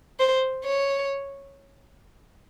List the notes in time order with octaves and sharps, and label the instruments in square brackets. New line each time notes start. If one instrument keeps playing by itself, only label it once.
[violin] C5
C#5